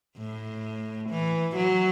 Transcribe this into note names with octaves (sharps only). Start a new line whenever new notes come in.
A2
E3
F#3